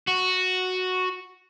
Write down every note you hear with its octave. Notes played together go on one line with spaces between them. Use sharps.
F#4